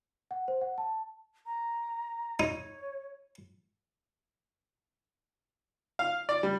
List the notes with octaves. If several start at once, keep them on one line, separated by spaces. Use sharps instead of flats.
F#5
C5
F#5
A5
A#5
D#4 C#5
F5
D5
G3